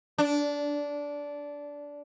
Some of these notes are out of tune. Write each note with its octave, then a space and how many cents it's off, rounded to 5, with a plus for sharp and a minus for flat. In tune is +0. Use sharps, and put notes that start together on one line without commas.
D4 -15